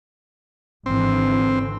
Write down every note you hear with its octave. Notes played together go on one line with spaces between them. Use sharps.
G#1 D3 E3 C4